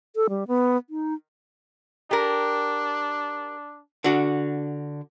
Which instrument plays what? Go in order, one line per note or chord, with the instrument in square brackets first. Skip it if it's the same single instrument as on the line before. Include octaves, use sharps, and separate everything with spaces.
[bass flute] A4
G3
B3
D#4
[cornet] D4 [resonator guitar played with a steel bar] G4 A#4
[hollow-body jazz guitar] D3 D4 F#4